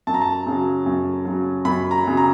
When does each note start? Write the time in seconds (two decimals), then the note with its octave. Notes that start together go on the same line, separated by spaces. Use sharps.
0.07 F#2 A5
0.14 A#5
0.22 A5
0.47 C#3 F#3
0.86 F#2
1.25 C#3 F#3
1.65 F#2 B5
1.91 A#5
2.04 C#3 F#3
2.17 A#5